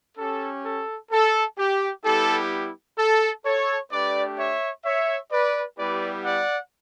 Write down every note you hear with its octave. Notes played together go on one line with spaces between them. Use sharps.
C#4 G4 A4
A4
A4
G4
G3 B3 E4 G4 A4
A4
A4 C#5
A3 D4 G4 B4 D5
C#5 E5
C#5 E5
B4 D5
G3 B3 E4 G4 B4 D5
D5 F#5